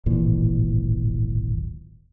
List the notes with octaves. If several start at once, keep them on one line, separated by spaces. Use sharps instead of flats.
D1 G#1 A#2 E3